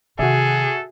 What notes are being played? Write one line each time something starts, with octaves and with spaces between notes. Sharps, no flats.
C3 D#3 F#4 G#4 A4 E5